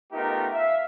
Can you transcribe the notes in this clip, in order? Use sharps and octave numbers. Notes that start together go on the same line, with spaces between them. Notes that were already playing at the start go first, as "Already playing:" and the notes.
A3 B3 D#4 F4 G4 A#4
E5 F5